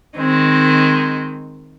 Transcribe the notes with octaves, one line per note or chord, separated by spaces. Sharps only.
D#3 G#3 C4